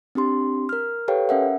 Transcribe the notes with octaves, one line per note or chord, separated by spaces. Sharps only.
C4 D4 G4 C6
A#4 F6
G4 A4 B4 C#5 F5 G5
C#4 A#4 E5 F#5